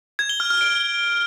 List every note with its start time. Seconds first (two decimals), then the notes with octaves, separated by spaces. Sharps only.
0.19 G#6
0.29 G7
0.40 F6
0.50 F6
0.61 D7